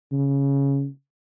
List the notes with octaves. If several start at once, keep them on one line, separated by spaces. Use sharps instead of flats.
C#3